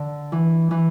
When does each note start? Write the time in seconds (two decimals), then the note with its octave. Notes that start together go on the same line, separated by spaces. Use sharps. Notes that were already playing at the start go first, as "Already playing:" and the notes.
Already playing: D3
0.32 E3
0.71 E3